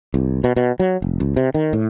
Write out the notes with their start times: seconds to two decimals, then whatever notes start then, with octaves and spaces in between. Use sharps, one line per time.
0.14 C2
0.44 B2
0.56 B2
0.80 F#3
1.02 F1
1.20 C#2
1.36 C3
1.54 D#3
1.73 A2